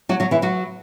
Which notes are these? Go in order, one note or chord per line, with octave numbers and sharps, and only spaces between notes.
F#3 F#4
F#3 F#4
E3 E4
F#3 F#4